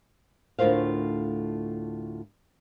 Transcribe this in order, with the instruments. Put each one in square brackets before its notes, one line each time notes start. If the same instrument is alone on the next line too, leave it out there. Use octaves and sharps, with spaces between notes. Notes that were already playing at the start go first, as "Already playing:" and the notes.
[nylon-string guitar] D2 A2 F4 A#4 C5 F5